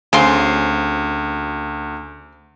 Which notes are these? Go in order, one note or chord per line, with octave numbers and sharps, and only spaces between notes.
D2 C#3 C4 C6